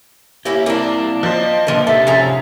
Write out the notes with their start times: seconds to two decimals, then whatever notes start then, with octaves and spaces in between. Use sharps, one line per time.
0.45 A#3 C#4 E4 G4
0.66 A#3 C4 D4 E4
1.23 F3 C5 D#5
1.67 A#2 D3 F3 B4
1.87 C3 D#4 G4 A4 E5
2.07 F3 C#4 G#4 A#5